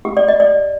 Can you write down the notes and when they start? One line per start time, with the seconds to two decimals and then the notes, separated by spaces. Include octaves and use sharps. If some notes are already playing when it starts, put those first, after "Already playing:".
0.05 G4
0.17 D5
0.28 D#5
0.40 D5